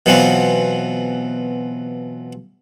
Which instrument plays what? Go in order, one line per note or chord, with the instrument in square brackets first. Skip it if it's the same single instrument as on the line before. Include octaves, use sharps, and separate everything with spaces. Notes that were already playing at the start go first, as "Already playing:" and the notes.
[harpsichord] B2 E3 F#3 B3 C4 F4